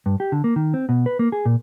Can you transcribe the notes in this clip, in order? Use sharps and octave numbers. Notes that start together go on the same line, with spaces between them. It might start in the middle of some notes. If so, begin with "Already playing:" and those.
G2
G4
D3
A#3
D#3
C4
B2
B4
A#3
G#4
A#2